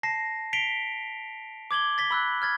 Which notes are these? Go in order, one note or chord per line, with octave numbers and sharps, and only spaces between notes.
A5 A#6 C7
B6 C7 D7 F7 G7
D6 G#6 F#7 G7
A6 B6 G7
B5 E6 F#6
F6 G#6 A6